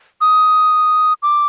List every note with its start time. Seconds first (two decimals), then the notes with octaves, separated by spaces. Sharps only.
0.21 D#6
1.23 D6